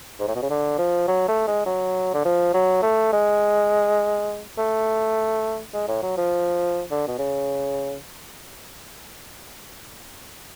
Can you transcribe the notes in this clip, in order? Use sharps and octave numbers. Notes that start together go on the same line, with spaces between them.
G#2
A2
B2
C#3
D3
F3
F#3
A3
G#3
F#3
D3
F3
F#3
A3
G#3
A3
G#3
A2
F#3
F3
D3
B2
C#3